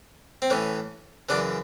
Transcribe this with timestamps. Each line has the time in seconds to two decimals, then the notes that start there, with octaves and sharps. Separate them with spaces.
0.42 C4
0.50 A2 E3 C#4
1.29 F#2 C#3 E3 D4